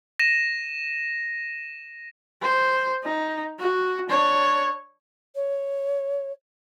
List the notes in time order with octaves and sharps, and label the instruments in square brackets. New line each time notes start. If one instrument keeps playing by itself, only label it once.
[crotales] A#6 D#7 E7
[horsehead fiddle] C5
D#4
F#4
D4 C#5
[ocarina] C#5